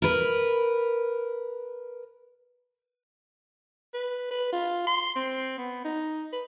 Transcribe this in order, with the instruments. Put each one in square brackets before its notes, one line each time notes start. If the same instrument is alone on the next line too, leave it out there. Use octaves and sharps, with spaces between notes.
[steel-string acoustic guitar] A#4 B4
[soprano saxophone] B4
B4
F4
C6
C4
B3
D#4
B4